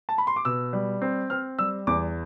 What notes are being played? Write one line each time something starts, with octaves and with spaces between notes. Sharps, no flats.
A5
B5
C6
D6
B2 E6
G3
C4
C4 F6
G3 E6
E2 D6